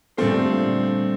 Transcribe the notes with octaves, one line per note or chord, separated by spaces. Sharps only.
A#2 G3 A3 C4 D4 F4 C5